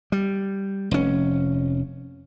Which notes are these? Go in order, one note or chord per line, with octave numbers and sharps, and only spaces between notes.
G3
F1 C#4